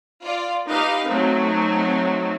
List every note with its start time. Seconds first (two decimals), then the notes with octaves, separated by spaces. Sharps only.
0.23 F4 D5
0.68 D#4 G4 B4 D#5 F5
1.05 F#3 A3 C4 D#4